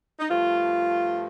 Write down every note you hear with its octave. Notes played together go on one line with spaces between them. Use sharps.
D#4
G2 F3 A3 F4